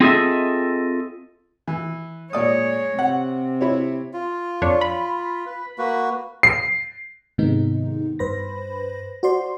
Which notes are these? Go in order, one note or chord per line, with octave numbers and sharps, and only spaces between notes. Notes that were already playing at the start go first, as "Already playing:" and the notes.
C4 F4 G#4 A4 D#5 E5
E3
A#2 G#3 C#5 D5 D#6
C3 F#5
E4 C#5
F4
F2 D4 C#5
B5
B4
A#3 F#4 B4
C7
G#2 C3 D#3 G#3 B3 D#4
G2 B4 C5 B5 A#6
F#4 C5 D5 C6